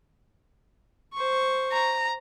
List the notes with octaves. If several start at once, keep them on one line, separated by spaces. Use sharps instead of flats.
C5 C#6
A#5